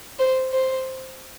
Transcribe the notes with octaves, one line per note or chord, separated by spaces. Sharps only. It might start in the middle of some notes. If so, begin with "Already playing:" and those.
C5
C5